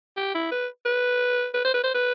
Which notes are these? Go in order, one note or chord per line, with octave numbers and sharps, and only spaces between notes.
G4
E4
B4
B4
B4
C5
B4
C5
B4